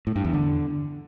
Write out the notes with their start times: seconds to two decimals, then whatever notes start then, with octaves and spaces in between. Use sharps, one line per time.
0.07 A2
0.16 G2
0.25 E2
0.33 D3